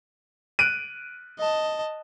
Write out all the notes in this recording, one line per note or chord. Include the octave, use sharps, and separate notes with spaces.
F#6 D7 D#7
D#5 A5